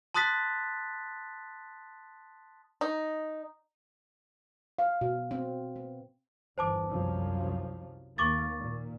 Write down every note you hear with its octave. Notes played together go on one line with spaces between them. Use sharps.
A5 C6 D#6 F#6 A6 B6
D#4
F5
B2
C4
B3
G1 E2 C5 A5 D6
C2 F#2 F3
D#2 A#3 C#6 D6 A6
A#2